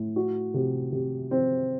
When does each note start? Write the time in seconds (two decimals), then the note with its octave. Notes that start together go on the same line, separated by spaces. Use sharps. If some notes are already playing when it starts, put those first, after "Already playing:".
Already playing: A2
0.16 F#4
0.54 C3
0.92 C3
1.31 C4